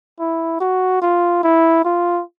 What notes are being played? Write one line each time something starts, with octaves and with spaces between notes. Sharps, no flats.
E4
F#4
F4
E4
F4